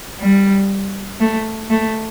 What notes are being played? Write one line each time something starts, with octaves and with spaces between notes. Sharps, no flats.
G3
A3
A3